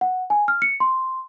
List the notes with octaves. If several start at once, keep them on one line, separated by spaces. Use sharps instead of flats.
F#5
G#5
F6
C#7
C6